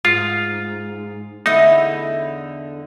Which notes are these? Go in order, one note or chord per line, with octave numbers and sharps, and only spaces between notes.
G#2 F4
E2 D3 D#4 E4